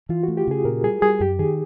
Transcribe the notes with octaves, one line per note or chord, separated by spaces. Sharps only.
E3 F4
A3 F#4
G4
C#3 G#4
A#2 A#4
G3 G#4
G3 G#4
F#2 G4
D#3 G#4